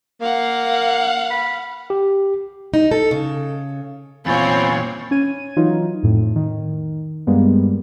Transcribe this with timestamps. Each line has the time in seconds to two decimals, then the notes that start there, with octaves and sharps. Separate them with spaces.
0.21 A#3 F5 F#5
1.30 B5
1.90 G4
2.74 D#4
2.91 A4
3.11 C#3
4.26 E2 A#2 C4 F4 C#5 G#5 B5 A6
5.11 C#4 G#6 D#7
5.57 E3 F#3 D#4 F4
6.03 F2 A2
6.36 D#3
7.27 G2 G3 G#3 A#3 B3